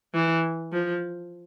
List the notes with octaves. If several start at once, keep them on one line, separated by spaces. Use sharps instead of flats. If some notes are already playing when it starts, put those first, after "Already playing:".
E3
F3